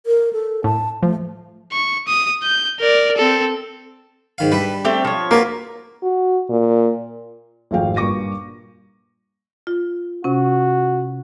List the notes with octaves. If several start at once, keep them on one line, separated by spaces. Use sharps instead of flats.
A#4
A4
A2 A5
F3 A3
C#6
D#6
G6
A#4 D5
C4 A4
G#2 D#3 F5
G3 D4 B4 E5
A3 C4 G4
F3 C#5
A#3 F4 F#4 B4
F#4
A#2
G#1 F2 A3 G#4 F5 G5
G2 A#2 C#6 D6 A#6 D#7
F4
C3 C#4 F#4